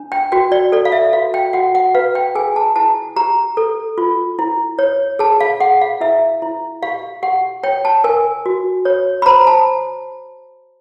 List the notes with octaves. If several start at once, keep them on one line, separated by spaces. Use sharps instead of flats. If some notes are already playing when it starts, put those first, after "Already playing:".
Already playing: D4
G5
F#4 G5
D5
A4 D5
F5
E5
F#4 F5
G5
F#4 F#5
F#5
B4 F5
G5
G#4 G#5
A5
E4 A5
G4 A#5
A4
F4
E4
C#5
G#4 A5
F5
G#4 F#5
F5
E4 E5
E4
G4 F5
G4 F#5
C#5 G5
A5
A#4 G#5
F#4
C#5
B5
C5 A#5
A5